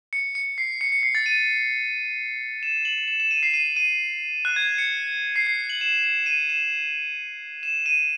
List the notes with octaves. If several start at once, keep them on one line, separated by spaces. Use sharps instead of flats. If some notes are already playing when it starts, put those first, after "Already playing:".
C#7
C#7
C7
C#7
C#7
C7
A6
D#7
E7
F#7
E7
E7
D#7
C7
D#7
D#7
F#6
G#6
C#7
C7
C7
F#7
E7
E7
D#7
E7
E7
D#7